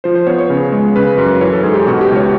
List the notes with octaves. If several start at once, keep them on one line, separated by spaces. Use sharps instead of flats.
F3 C5
C5
B3 C#5
C#5
C#3
G#3
C#3 B4
F#2
E3 C#5
A4
G#2 G#4
G4
B2 F#4
G4
C#2
C#5